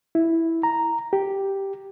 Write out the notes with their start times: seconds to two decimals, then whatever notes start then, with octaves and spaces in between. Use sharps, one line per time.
0.15 E4
0.63 A#5
1.13 G4